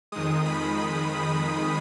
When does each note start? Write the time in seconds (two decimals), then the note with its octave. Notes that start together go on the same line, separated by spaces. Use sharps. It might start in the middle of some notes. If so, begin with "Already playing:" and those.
0.12 F2 D#3 G#3 D#6
0.45 B5